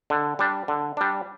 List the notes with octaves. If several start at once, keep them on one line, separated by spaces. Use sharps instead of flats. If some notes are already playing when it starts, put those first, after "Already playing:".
D3
G3 D4
D3
G3 D4